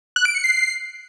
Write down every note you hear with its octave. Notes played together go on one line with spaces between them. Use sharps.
F#6
D7
C#7
C7